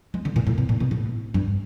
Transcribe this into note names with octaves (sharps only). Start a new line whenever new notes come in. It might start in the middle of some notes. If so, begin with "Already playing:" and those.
G#3
D3
A#2
A2
B2
A#2
B2
A2
G2